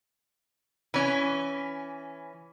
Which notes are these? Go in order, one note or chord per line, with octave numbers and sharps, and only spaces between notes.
E3 C#4